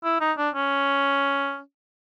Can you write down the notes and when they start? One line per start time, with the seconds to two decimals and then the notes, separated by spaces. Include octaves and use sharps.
0.04 E4
0.21 D#4
0.38 D4
0.55 C#4